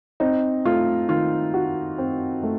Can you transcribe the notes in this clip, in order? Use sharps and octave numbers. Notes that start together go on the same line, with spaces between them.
C4 D#4
A3 F4
D#3 F4
F#4
C4
A3